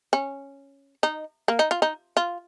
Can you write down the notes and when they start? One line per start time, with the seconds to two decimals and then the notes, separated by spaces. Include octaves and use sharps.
0.13 C#4
1.03 D#4
1.48 A#3
1.59 D#4
1.71 F4
1.82 D#4
2.17 F4